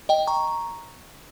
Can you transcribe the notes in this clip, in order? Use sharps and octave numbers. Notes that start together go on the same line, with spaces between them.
D#5 G5
A#5 C#6